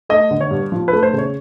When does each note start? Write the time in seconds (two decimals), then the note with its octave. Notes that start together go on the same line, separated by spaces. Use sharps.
0.09 A3 D#5
0.31 D3
0.41 C#5
0.51 G2
0.72 F3
0.88 A3 B4
1.03 C5
1.13 C#3
1.18 C#5